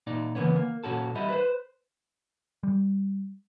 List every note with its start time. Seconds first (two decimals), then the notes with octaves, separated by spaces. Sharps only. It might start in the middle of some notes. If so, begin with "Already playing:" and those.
0.07 A#2 D#4 D5
0.35 C#3 E3 A#3 B3 C#4
0.56 A#3
0.84 A#2 C#4 F#4 A4
1.15 G3 E4 D#5
1.30 B4 C5
2.63 G3